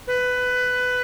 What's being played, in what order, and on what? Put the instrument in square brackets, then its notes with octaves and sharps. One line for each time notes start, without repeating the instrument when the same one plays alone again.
[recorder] B4